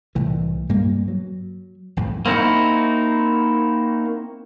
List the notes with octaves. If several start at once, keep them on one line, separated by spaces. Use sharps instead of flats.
C2 A2 E3
G2 G3 A#3
F#3
G#1 F2 A2
A#3 C4 D#4 E4 F#4